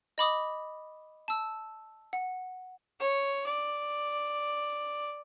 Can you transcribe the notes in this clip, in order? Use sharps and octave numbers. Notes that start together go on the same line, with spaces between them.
D#5 B5 D6 D#6
A5 E6
F#5
C#5
D5